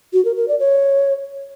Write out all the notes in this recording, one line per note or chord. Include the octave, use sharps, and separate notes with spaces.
F#4
A#4
A#4
D5
C#5